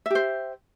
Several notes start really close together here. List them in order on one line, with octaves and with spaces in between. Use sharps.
E5 G4 C5